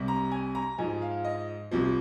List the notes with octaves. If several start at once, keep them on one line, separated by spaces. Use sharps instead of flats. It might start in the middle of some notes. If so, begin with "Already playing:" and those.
Already playing: C2 C3 G3
A#5
G#5
A#5
G#2 F3 G#3 G#5
F5
D#5
C2 C3 F3